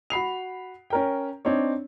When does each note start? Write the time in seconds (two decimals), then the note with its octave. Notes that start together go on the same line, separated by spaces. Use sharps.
0.10 F#4 B5 C7 F7
0.90 C#4 A#4 G5
1.45 C4 D4 D#4 C#5